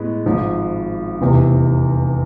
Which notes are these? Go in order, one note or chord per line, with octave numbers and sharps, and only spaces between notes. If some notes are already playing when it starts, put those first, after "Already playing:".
Already playing: A2 G#3 B3
G#1 G#2 F3
F1 E2 C3